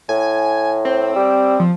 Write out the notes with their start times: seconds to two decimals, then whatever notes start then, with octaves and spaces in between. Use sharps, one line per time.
0.09 A2 G#5
0.85 C4
1.16 G3
1.60 F3